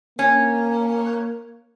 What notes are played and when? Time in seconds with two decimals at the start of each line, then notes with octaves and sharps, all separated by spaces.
0.19 A#3 C#4